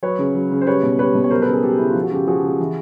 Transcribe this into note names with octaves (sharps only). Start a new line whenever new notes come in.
F#3 B4 C#5
C#3
F#3
C#3
C5
G3 B4 C#5
B2
G3 B4 C#5
B2
C#5
F#3 A#4 C5
A4 B4
C#3
G#4 A#4
F#3 G4 A4
C#3 E4
F4
F3
F#4
C#3 G4
F3 F#4 G#4
C#3
E3